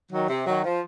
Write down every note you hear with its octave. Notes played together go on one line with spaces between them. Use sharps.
D#3 F#3
C3
D#3 F#3
F3